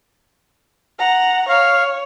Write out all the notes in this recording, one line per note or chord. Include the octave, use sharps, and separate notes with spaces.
F#5 A#5
C#5 F5